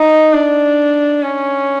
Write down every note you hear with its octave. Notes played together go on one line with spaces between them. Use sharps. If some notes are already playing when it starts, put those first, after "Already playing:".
Already playing: D#4
D4
C#4